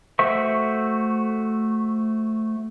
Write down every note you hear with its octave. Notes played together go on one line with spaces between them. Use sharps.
A3 F#4 C5 E5 C#6